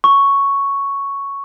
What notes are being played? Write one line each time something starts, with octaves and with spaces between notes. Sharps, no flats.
C#6